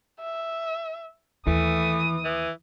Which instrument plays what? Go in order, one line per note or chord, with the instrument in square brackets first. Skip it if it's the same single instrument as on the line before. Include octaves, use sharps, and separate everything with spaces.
[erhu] E5
[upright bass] D#2 [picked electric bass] E3 [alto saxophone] A3 [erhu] D#6
[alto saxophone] E3